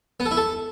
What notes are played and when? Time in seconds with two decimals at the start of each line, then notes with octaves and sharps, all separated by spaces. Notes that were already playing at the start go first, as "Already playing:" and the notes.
0.20 B3
0.26 A4
0.31 E4
0.37 A4